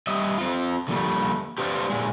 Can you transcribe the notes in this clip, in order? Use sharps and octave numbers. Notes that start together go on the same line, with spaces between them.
G3 D#5 E5
C4 F4
D3 F3 G3 A3 A#3
G4 B4 C5 D5 F5
A#2 G#3